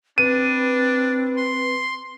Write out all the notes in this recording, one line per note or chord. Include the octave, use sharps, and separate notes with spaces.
C4 D4 B4 D#7
C6